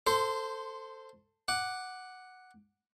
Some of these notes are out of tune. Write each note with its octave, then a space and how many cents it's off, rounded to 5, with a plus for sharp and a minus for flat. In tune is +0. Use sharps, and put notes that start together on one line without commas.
A4 +15 C5 +0 C6 -20
F#5 +0 D6 +5